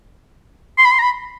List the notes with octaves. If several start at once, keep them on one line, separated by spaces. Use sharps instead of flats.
C6
B5
C6
A#5
B5